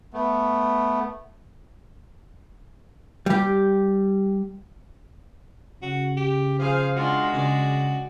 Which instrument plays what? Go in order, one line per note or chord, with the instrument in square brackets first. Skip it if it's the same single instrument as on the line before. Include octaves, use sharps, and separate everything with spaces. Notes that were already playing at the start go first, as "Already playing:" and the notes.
[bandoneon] A3 B3
[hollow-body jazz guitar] G3 G4
[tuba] C#3 [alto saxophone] F#4
[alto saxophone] G4
[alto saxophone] F3 [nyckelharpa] G#4 F5 [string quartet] C5
[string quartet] G#3 [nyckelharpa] D4 F4 [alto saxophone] F#4
[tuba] C#3 [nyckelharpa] D5